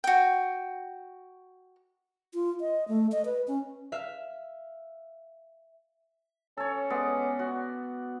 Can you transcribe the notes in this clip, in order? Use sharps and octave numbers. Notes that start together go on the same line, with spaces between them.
F#4 G5
F4
D#5
A3
D#5
B4
C#4
E5 F5
C#4 A4 C#5
G#3 B3 D5
F#4